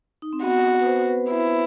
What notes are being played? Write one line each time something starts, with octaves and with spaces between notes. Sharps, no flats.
D#4
C4
B3 F#4
B4
C5
B4
E4 C5